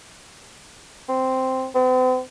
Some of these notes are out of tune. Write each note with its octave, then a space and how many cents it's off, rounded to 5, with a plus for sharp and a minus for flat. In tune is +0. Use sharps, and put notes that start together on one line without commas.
C4 -5
C4 -45